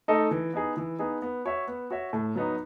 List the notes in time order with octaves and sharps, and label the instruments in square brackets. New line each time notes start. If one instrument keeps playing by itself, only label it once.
[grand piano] A3 D#4 A4 D#5
E3
B3 D#4 G#4
E3
B3 D#4 G#4
B3
F#4 C#5 E5
B3
F#4 C#5 E5
A2
F#3 B3 D#4